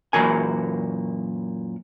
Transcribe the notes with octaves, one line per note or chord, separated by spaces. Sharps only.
F#2 A#2 E3 F#4 A#4 G#5